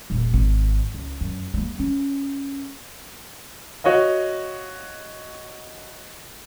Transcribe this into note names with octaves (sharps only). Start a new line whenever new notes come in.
E1 A#1
G#1
C#2
F#2
G3 A#3
C#4
F#4 C#5 D#5 F5